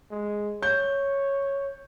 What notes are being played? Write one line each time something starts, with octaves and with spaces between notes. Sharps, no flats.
G#3
C#5 G6